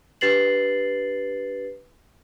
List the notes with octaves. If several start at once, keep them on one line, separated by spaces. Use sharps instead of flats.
D4 G4 B4 A6 C7 F#7